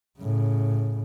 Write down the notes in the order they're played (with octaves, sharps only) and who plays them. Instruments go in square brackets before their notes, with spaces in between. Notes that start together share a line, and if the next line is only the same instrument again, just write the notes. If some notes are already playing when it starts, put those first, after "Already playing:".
[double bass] A2 C#3